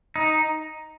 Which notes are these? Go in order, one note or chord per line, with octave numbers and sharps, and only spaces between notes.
D#4